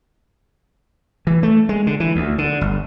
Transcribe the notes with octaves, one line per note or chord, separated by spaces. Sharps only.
E3
A3
G#3
D3
E3
D2
D3
G1